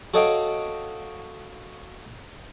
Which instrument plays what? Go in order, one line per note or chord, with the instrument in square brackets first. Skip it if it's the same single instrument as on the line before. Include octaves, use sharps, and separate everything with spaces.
[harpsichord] F#4 A4 C#5 D#5 F5 G5